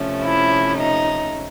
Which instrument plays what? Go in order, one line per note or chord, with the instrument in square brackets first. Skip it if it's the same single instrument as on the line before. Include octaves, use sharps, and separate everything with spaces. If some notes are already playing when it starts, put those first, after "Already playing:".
Already playing: [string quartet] C3 F3 A3 C#4
[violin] E4
D#4